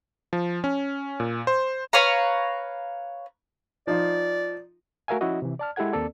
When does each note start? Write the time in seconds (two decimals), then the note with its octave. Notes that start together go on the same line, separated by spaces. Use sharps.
0.33 F3
0.64 C#4
1.20 A#2
1.47 C5
1.93 B4 C#5 F5 A#5
3.87 F3 D#4 F4 D5
5.08 A3 F#4 A#4 E5 F5 G#5
5.21 F3 C#4 E4 F#4 D#5
5.42 C3 E3
5.59 D5 A5 F6
5.76 G#3 E4 G4 A4 F#5 G#6
5.93 D#2 A#3 C4 A4 D5